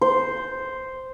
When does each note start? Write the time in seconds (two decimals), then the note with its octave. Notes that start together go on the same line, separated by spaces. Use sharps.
0.01 C5